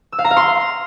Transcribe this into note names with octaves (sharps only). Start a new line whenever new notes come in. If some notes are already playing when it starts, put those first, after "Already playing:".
E6
F5
A#5
F5
C6